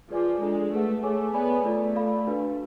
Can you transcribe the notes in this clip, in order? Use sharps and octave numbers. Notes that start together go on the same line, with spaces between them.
F3 G#4 B4 D5 G#5 D6
G#3 D4 F4 A4 D5
A3 G#4 B4 F#5
A3 G#4 C#5 G#5 D6
B3 G#4 D5 G#5 B5
A3 F4 A4 D5
A4 D5 F5 B5
D4 F#4 B4 F5